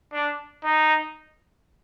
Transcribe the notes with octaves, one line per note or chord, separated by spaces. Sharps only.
D4
D#4